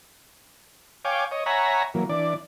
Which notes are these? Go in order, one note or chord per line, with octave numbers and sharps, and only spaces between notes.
C#5 F5 G5 G#5 D6
C#5 D#5
C#5 E5 F#5 G#5 A#5 B5
E3 F#3 A#3
E3 D4 D5